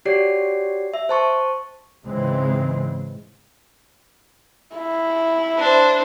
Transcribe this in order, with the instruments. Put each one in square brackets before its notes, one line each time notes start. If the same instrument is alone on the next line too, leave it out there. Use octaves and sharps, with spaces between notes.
[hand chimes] F#4 G4 C#5 D5 C7
E5
C5 A5 C#6
[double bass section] G#2 C#3 E3 G#3 C4
[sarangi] E4
[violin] D4 C5